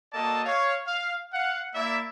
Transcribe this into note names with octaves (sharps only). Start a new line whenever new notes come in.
A#3 F#4 A4 D5 D#5 A5
C#5 F5
F5
F5 F#5
A#3 E4 D5 E5